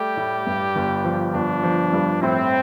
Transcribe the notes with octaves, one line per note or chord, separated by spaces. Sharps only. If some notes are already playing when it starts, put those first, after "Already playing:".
Already playing: G3 A3 G4
A2
G2
G1
F3
G1 D4
F3
G2
A2 C4